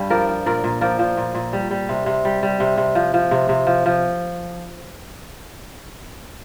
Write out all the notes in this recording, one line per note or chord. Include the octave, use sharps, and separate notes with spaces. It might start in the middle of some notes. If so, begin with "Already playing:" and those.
Already playing: G2 G3
F3 A#4 D5
F3
A#2 A#4 D5
A#2
F3 A#4 D5
F3
A#2
A#2
G3
G3
C3
C3
G3
G3
C3
C3
F3
F3
C3
C3
F3
F3